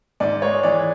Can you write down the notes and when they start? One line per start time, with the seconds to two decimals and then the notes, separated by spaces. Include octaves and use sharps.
0.20 G#2 D5
0.42 G#3 C#5
0.63 E3 D5